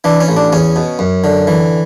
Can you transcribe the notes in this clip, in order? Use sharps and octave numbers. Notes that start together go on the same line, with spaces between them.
E3 D4
C#4
A1
D4
E2 C#4
B2
F#2
D3
E3